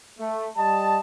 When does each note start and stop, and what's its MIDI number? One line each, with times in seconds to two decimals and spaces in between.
0.20 0.48 57
0.57 0.99 55
0.57 0.99 75
0.57 0.99 81